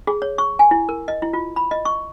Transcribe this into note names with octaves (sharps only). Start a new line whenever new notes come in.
G#4
C#5
C#6
G#5
E4
A#4
D#5
E4
F4
B5
D#5
C#6